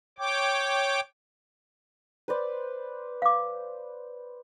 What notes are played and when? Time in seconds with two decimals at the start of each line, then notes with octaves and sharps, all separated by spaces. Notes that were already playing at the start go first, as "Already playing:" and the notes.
0.19 C#5 G5 D6
2.28 B4 C5 D5
3.22 F5 D6